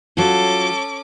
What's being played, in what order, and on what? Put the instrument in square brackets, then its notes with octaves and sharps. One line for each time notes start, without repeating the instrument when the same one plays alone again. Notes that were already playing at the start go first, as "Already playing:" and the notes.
[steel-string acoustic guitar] F#3 F4 [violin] C#4 D6 [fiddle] A4